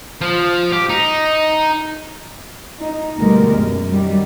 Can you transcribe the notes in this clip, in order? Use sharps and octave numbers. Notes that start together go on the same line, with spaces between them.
F3
G4
D#4
D#4
D2 B2 G3 G#3 A#4
F#2
D#3 F#3 G3